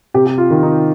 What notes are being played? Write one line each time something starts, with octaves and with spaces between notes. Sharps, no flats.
C3 G4
G4
F4
D#3
D#4